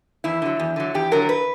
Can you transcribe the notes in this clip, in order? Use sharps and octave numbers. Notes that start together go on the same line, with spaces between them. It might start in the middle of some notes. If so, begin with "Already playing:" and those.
E2 E4
D3 F#3
E2
D3 F#3
E2 G4
D3 F#3 A#4
B4